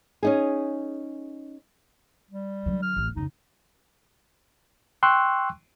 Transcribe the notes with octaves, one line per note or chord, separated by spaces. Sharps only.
C#4 D#4 G#4
G3
D3 F#3
F6
A1
F2 C#3 D#4
G5 C6 C#6 E6 F#6